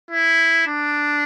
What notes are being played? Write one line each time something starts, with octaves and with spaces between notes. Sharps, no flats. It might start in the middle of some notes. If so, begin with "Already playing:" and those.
E4
D4